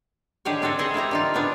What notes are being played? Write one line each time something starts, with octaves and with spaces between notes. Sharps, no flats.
D3 D#3 G4 G#4 C#5 G#5
C4 D4 F#4 A4 G#5
G#4 A4 C5 D#5 E5
A#3 E4 G4 A#5
D3 D#4 F4
C#3 B3 D4 G#5